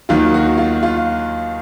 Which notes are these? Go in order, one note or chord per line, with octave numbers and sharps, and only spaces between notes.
D#2 D#3 F#3 F4
F#4
F4
F4